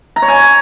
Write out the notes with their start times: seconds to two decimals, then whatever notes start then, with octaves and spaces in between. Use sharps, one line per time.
0.16 A#5
0.22 C#5
0.28 G#5